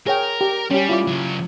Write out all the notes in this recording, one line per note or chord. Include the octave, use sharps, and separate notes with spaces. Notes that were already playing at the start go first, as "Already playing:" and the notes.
G#4 A#4 C#5 G5
G4
G3 C#4 G4
E4 F4 D6
C#3 F#3